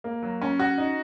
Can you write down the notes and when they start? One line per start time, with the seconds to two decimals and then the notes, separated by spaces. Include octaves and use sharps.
0.04 A#3
0.23 F#3
0.42 C#4
0.59 F#4
0.78 D#4